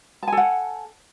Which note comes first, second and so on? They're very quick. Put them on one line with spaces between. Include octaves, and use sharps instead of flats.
A5 G#5 A4 F#5